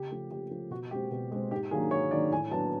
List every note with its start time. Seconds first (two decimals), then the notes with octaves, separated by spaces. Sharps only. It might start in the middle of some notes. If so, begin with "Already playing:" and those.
Already playing: C#3 G4
0.11 F3 A3
0.31 C#3 G4
0.51 F3 A3
0.71 B2 F#4
0.91 G#3 C4 G4
1.11 B2
1.31 G#3 C4
1.51 G#2 G4
1.71 D#3 F#3 A#3 D4 G#4
1.91 G#2 C#5
2.11 D#3 F#3 A#3 D4 D5
2.32 A2 G#5
2.51 F#3 B3 D4 A5